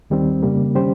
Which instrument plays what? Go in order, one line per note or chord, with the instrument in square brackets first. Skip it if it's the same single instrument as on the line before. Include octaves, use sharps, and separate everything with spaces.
[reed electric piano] D#2 D#3 G3 C4
F2 C#3 G3 A#3
D#3 G3 C#4 G4 C5